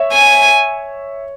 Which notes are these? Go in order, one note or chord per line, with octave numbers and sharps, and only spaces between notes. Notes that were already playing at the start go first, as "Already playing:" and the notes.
Already playing: C#5 E5
G#5